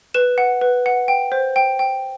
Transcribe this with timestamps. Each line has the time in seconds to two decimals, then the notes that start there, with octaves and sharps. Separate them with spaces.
0.14 B4 E7
0.38 F#5
0.61 B4
0.86 F#5
1.08 G5
1.32 C5
1.56 G5
1.79 G5